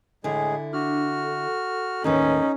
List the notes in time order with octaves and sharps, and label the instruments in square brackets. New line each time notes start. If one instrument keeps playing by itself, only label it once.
[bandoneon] A2 G#3 G#4 [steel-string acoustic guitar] D3 E4 [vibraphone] G#5
[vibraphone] D4 [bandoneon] F#4 F6
[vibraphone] A4
[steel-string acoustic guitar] D#2 A2 B4 [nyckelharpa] C#4 [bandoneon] D#4